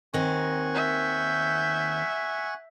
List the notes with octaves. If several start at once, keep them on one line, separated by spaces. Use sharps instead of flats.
D#2 D#3 C4 F#5 G#5 C#6
E5 G6